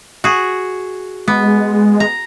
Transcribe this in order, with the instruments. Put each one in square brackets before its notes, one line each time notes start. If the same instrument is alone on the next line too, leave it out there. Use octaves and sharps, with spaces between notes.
[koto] F#4 G#4
[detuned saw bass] G#3 [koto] B3
[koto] A#5